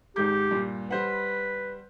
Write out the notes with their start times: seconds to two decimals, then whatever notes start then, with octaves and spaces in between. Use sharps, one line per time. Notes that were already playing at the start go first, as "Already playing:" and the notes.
0.16 G#1 G#2 G4 G6
0.51 G2 A#2
0.91 G3 B4 C5 F#5